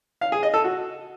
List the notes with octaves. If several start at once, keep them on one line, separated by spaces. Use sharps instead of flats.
F5
G#4
D#5
A4
F#4